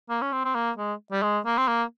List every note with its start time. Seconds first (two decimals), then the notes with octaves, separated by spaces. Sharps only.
0.10 A#3
0.22 C#4
0.32 C4
0.44 C4
0.55 A#3
0.77 G#3
1.11 G3
1.23 G#3
1.46 A#3
1.57 C4
1.67 A#3